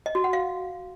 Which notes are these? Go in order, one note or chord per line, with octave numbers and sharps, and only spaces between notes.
D#5
F#4
F#5
F5